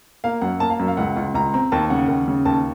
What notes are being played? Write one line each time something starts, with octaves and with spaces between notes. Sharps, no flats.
A#3 F5
F#2 F#5
A#3 A5
F5
F#2
F5
C#2 F#5
C#2
C#2 A#5
C4 A#5
D#2 A5
C#3 F#5
D#2
C#3
D#2 A5